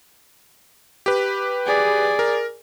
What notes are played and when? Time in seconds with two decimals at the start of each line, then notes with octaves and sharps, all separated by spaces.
1.06 G4 B4
1.66 G#4 D5
2.19 A#4